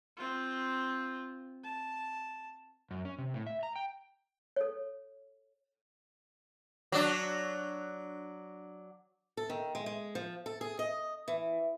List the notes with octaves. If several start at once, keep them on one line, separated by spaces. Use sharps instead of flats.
C4 F4
A5
F#2
C#4
C3
A2
E5
A#5
G5
A4 C#5
F#3 D4
A4
D#3
G#3
G#3
F3
A4
G#4
D#5
E3